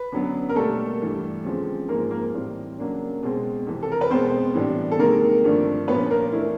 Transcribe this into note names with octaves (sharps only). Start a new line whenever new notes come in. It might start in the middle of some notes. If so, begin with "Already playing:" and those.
Already playing: B4
F#2 D3 F#3 B3
A#4
B2 G3 A3 A#3 A4
G2 E3 G3
E2 C#3 F3 G#3 C4
G#2 F3 G#3 A#3 A#4
A#3 A#4
A2 E3 G3 C4
C#3 F#3 A#3 D4
B2 G#3 C4
F2 C3 E3
A4
A#4
B4
B2 G#3 B3 C4 C5
A2 E3 G3 B3 D4
A4
C3 D#3 G#3 A#3 A#4
G2 D3 F3 A3 D4
A#2 F3 A#3 B3 C#4 B4
A#3 A#4
E3 A3 D4 E4